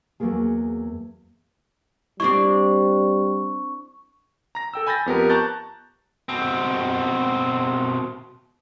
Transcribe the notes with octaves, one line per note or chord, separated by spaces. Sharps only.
E2 F#3 A3 A#3 G#4
G3 C4 D4 E4 C#6
A#5 A#6
A4 G5 E6
G#5 B5 G6 A6 A#6
F2 B3 G4 A#4
A5 A#5 C#6 F#6 G6 A6
B2 C4